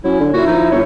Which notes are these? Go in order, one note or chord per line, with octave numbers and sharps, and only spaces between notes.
F#3 C#4 E4
D3
A#2 E4 F#4
F3 D#4
G1 C#5